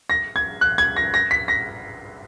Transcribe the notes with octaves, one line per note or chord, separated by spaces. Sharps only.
A#6
G#6
F#6
G#6
A#6
A#6
B6
A#6